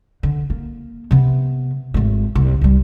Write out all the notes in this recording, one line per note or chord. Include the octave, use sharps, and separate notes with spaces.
D3
A#3
C3 B3
G#1 A3
C2
C2 G3